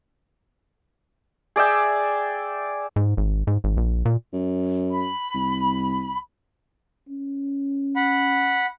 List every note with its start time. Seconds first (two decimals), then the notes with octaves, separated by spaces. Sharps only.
1.56 G#4 D5 E5 G5
2.96 G#2
3.17 G#1
3.47 G#2
3.64 G#1
3.77 A#1
4.05 A#2
4.33 F#2
4.91 B5
5.34 C2
7.08 C#4
7.96 F#5 B5